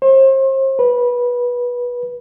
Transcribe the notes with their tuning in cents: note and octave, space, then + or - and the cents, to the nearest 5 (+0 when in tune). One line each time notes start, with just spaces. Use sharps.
C5 +35
B4 -20